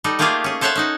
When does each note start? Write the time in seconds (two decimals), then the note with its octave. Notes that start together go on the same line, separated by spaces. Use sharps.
0.04 G3 D#4 A4
0.19 A3 A#3 F4 G4 G#4 F5
0.44 C#4 G#4
0.61 A4 C5 C#5 E5 F#5 A5
0.76 C#4 D#4 F#4